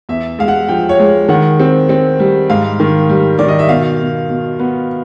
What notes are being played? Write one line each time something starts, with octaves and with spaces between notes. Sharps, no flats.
E2 E5
G#3 F5
F#5
F3 G5
C#5
G#3
D#3 F#5
C4
C4
G3
G#2 F5
D#3
G3
D#3 D5
D#5
E5
B2 F5
B2
B2
B3